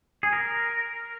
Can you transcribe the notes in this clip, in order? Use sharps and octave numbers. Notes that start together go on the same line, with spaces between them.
G#4
A#4